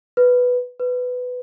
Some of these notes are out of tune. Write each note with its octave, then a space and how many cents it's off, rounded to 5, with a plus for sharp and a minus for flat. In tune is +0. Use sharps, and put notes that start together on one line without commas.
B4 +0
B4 +15